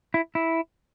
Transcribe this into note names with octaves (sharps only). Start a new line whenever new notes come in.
E4
E4